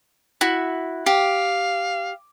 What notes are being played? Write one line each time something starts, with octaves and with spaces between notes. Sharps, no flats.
E4 F#4
G4 F5